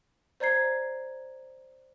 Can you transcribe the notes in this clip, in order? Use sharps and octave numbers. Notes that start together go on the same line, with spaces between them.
C5 D5 A#5 G#6 C7